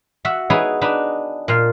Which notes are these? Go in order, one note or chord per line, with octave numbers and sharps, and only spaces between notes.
F#4 E5 F#5
B3 D#4 E4 G#4 B4 C#5
D4 D#4 B4
A#2 F5